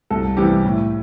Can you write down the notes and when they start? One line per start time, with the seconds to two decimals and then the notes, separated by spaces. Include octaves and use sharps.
0.10 C2 A4
0.37 C3 E3 G3 G4
0.65 A2